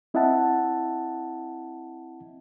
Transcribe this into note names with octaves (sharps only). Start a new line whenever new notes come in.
C4 E4 D#5 E5 F#5 A5